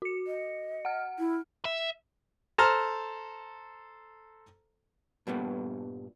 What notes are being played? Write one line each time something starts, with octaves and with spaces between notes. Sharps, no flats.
F#4 C#7
D#5
F#5 F6
E4
E5
A4 C5 A5 A#5 C6 F6
G2 A#2 G3 B3